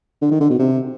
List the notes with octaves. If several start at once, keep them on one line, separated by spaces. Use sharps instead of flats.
D3
D#3
D3
B2
C3